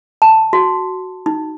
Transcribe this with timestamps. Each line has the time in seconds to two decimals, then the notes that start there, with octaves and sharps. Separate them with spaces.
0.22 A5
0.53 F#4
1.26 D#4